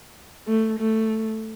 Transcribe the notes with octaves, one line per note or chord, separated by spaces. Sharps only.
A3
A3